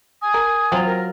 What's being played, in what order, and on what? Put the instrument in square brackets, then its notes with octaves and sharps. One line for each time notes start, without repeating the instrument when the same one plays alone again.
[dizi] G#5 [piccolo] D#6
[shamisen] A#4
[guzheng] F#3 F4 [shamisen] C4
[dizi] A#4